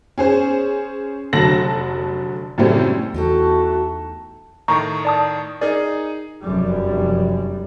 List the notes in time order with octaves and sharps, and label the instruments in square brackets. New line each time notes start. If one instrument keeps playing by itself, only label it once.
[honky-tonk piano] C#4 G#4 C5
F1 D3 F#3 A5 A#6 F#7
F#2 A2 C#3 G3 A3 C4
[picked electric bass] E2 [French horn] A3 [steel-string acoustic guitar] D#4 G4 A4 [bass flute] F#4
[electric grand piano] A2 D#3 [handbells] A#5 C#6
[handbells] D5 A5 D#6
[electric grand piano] D#4 G#4 [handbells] A#4 D5
[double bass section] F1 F#2 G3